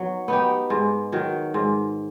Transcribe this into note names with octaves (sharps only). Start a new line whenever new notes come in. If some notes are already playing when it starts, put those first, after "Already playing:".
Already playing: F#3 B3 D#4
B3 D#4 G4
G#2
D#3 F#3
G#2